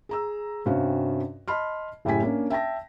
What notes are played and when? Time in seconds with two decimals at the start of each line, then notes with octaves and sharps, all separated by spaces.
0.09 G#4 A#5 E6
0.66 G2 C3 C#4 F#4 F5
1.48 D#5 A5 B5 C6 F6
2.05 F#1 A2 G4 G5 G#5 B6
2.22 A#3 C#4 D4
2.50 E5 G5 A5 A#6